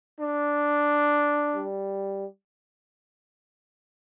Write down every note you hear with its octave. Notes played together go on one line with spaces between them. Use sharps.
D4
G3